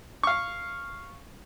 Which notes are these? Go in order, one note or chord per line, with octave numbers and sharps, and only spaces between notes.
F5 C#6